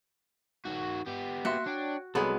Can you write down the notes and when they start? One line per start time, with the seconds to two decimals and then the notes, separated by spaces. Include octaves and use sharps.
0.65 D#3 F#4
1.08 B3 G4
1.45 A#3 F#4 E5 C6
1.67 D4 C#5 G5
2.15 C2 F#3 G#3 B3 A4 C#5 B5